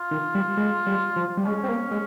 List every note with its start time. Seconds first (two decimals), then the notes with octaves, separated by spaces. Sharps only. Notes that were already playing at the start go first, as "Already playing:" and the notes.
Already playing: F4
0.11 D#3
0.35 G3
0.57 G#3
0.87 G3
1.16 F3
1.37 G3
1.46 G#3 C#4
1.64 C4
1.69 A#3
1.91 G#3